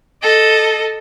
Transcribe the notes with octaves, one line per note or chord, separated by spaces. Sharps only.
A4 D#5